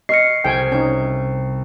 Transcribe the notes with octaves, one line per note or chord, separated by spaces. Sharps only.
D#5 C#6 F6 A#6 C7 C#7
C2 G5 G#5
C#4 D#4 G6